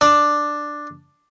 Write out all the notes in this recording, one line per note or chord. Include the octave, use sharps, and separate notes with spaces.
D4